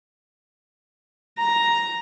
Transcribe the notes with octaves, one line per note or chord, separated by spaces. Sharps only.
A#5